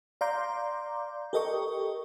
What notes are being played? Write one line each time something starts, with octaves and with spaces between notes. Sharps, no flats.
D5 F5 A#5 C6 D6 G6
G4 A4 A#4 D#5 G5 C#6